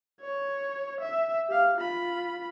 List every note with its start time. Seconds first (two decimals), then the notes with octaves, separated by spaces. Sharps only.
0.21 C#5
1.01 E5
1.48 G4 F5
1.77 F4 B5